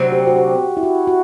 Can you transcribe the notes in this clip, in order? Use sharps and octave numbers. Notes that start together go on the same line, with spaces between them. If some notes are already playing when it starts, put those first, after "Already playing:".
Already playing: D2 C3 F#3 C4
G4
F#4
G4
E4
F#4
F#4